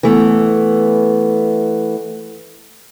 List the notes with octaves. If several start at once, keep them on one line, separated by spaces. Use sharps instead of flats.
E3 A3 B3